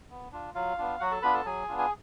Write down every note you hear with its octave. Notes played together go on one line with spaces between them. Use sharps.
B3
D4 F4
F#3 F4 F5
B3 D4 F4
F#3 F#4 F#5
A4 A5
B3 D4 F4 B4 B5
A4 A5
F#3 G#4 G#5
B3 D4 F4
G#5